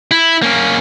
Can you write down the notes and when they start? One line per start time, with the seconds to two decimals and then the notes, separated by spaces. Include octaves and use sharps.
0.11 E4
0.42 A#3 C#4